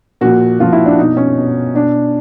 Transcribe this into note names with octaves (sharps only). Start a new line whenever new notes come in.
A#2 F3 F#4
A#2 F3 F4
E4
D4
B2 D#4
C#4
B2
B2 D4